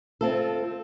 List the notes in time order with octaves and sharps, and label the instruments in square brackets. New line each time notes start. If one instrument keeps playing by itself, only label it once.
[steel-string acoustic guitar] C4 F4 A4